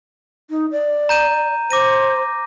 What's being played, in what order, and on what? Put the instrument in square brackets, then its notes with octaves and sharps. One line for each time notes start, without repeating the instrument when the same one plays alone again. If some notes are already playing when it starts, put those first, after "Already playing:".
[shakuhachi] D#4
D5
[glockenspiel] A#5 G6 D#7
[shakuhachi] C5 [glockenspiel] D6 A#6 D#7